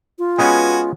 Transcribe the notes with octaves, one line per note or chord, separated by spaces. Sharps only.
F4
G#3 B3 C#4 F#4 B4 G#5